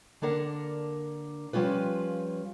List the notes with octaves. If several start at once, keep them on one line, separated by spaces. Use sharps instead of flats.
D3 A#3 D4 A#4 F#5
F3 G3 C#4 F4 B4